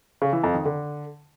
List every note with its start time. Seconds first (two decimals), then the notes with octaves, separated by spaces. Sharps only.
0.22 C#3
0.33 E3
0.44 F2
0.54 D#3
0.65 D3